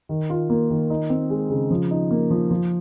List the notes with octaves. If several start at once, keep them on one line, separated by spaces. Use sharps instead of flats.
D#3
F4
A#3
D#3
D#4
C4
G#3
C#3
F3
D#4
A#3
F3
F3